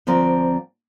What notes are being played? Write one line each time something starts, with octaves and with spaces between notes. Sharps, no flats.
D2 F3 C4 D5 A#5